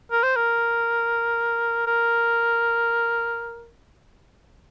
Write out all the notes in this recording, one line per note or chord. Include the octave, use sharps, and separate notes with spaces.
A#4
C5
A#4
A#4